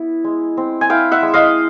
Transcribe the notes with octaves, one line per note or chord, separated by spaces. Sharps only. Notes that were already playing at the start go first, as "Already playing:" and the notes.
Already playing: B3 E4
G#3
C4
G#5
E4 F5 G5
E5 F#5
G#3
D#5 F5